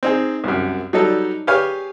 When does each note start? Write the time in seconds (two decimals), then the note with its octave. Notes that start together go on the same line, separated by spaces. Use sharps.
0.03 C4 D#4 G#4
0.44 C2 F#2
0.93 F#3 G3 D#4 A4
1.47 G4 G#4 B4 C#5 F5 G#5